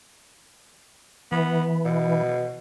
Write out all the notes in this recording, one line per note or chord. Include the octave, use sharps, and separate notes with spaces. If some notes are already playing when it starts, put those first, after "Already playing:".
E3 B3
B2